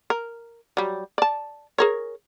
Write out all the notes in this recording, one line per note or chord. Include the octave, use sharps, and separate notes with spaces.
A#4
F#3 G3
D5 A5
G#4 A#4 C#5